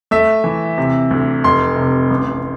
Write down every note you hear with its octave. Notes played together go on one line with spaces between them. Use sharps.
A3 E5
E3
C3
D2
F1 C6
C3
A1